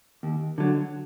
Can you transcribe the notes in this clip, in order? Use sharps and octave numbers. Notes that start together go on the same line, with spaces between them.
D#2
D3 F#3